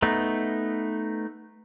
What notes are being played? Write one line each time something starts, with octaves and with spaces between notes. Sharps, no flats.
A3 B3 D#4